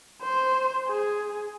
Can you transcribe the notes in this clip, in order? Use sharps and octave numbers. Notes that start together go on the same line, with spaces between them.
C5
G#4